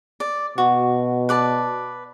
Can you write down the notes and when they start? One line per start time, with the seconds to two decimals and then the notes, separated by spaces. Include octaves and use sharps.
0.20 D5
0.58 B2 F#4
1.29 B4 D5 A5